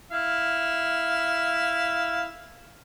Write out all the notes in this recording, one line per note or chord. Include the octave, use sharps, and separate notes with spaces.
E4 F5